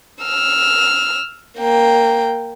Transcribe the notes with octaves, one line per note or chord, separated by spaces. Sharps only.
E6 F6
A#3 G5